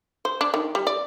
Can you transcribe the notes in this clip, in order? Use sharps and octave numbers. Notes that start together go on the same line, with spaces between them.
C5
D4
D#3
G3
D5